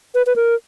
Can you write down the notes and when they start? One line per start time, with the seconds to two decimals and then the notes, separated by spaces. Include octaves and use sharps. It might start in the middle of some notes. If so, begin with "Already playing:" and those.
0.15 B4
0.26 B4
0.36 A#4